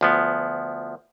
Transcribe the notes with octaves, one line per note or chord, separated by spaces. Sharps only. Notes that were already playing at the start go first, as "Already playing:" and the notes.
D2 F3 B3